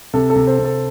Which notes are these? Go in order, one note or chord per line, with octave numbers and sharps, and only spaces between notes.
C3 A4
A4
C3
C5
C3
A4